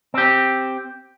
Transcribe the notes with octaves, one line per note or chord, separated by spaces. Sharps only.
C4 G4